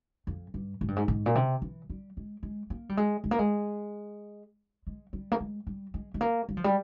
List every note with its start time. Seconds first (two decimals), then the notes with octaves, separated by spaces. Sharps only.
0.27 F2
0.54 G2
0.81 G#2
0.88 G2
0.96 G#2
1.08 G#2
1.26 A#2
1.35 C3
1.62 E3
1.90 G3
2.17 G#3
2.43 G#3
2.70 A#3
2.89 G3
2.97 G#3
3.24 G#3
3.31 A#3
3.39 G#3
4.87 G#3
5.13 G3
5.32 A#3
5.40 G#3
5.67 G3
5.94 G#3
6.14 G#3
6.21 A#3
6.49 G3
6.57 F3
6.64 G3